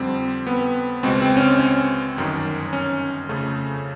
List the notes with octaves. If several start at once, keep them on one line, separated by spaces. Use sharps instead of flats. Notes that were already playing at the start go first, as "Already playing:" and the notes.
Already playing: F2 D3 G3 C4
B3
C#2 B2 G#3 C4
C4
C#4
C4
C#4
G1 F#2 D#3
C#4
F2 C#3 F3 A3